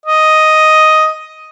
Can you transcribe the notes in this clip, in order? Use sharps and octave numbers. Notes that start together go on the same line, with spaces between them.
D#5